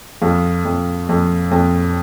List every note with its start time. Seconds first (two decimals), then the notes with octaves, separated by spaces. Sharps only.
0.22 F2 F4
0.65 F2
1.09 F2
1.51 F2